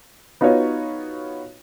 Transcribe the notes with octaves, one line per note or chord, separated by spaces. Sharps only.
B3 D#4 F4 F#4 B4 C#5